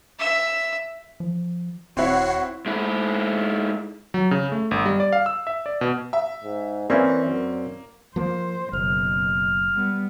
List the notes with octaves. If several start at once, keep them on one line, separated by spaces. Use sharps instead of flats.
E5 E6
F3
D#1 C4 E4 F#4 C#5 F#5 C7
G#2 E4
F#3
C#3
A3
G1
G3
D5
F5
E6
E5
D5
B2
E5
G#2
E3 A#3 C4 C#4 D5
F#2
F3 A#3 C5
F#1 B2 F6
G3 B3